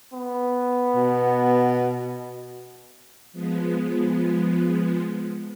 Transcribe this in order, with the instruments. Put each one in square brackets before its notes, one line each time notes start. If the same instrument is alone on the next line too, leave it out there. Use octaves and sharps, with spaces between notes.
[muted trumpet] B3
[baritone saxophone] B2
[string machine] F3 G#3 B3